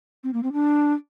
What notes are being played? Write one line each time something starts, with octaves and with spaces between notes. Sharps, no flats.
C4
A#3
C4
D4